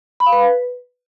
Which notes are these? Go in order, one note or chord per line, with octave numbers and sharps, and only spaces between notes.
B5
F5
B4